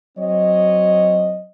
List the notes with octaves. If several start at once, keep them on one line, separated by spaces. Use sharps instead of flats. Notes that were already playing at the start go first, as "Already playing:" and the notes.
F#3 C4 C#5 D#5